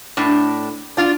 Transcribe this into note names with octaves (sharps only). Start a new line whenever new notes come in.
A2 D4
D4 F4